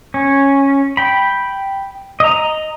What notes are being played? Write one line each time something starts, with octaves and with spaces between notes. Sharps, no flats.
C#4
G5 B5
D#5 A#5